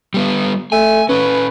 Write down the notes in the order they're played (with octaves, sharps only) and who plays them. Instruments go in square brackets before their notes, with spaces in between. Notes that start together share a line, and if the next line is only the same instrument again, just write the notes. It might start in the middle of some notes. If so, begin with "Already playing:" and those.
[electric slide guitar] G3 B3
[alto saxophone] A3 [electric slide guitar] G#5
[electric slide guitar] C#4 A4 [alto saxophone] B4